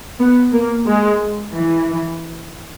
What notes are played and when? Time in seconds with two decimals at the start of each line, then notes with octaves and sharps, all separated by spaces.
0.20 B3
0.53 A#3
0.87 G#3
1.54 E3